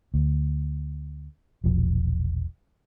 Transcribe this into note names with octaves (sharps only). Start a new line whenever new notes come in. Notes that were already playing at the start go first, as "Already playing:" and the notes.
D2
E1 A#1 F3